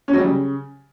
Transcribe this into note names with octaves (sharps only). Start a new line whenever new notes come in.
C#4
F#3
G3
C#3